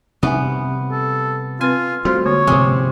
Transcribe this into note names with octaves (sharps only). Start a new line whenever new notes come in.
C3 G3 B3 D#4 E5 G#5
A4
C4 F4 B4 G#5
G3 A3 C4 F4 F#4 C5 C6
D3 G#3 A#3 C#5
G#2 C3 F3 G#5 D#6